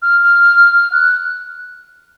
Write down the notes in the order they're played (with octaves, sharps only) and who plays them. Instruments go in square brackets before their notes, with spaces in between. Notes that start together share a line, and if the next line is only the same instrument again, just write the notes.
[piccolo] F6
F#6